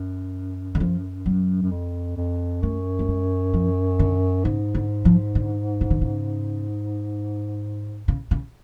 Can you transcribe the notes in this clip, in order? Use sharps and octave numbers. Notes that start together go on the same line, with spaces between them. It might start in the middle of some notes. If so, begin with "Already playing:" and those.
Already playing: F#2
D3
F3
F#3
F#2
F2
F2
F#2 A3
A3
G#3
F3
D3
G#2 C#3
D3
F3
D3
C#3
D3
C#3
C#3
C#3